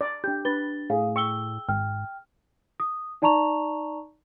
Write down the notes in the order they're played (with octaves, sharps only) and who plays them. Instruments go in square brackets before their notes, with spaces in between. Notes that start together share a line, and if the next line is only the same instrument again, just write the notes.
[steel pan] D5
[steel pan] D4 G4 [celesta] G6
[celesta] D4 A6 G7 [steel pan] B4
[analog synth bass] A2 [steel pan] G#4 [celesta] F5
[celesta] G5 E6 G7 [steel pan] C#6
[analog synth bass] G#1 [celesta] G5 F6
[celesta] D#6
D#4 D5 A5 A#5 C#6 F7